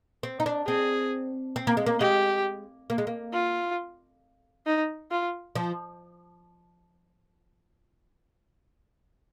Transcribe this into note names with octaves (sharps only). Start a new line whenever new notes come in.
C4
D#4
D4
C4 G#4
C4
A#3
G#3
A#3
G#3 G4
A#3
G#3
A#3
F4
D#4
F4
F3